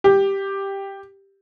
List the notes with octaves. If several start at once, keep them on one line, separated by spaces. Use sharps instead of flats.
G4